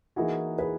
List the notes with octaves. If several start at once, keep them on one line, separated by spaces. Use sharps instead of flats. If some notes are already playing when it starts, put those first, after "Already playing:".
E3 A#3 D#4 E4 F#4 G#4
G#4 B4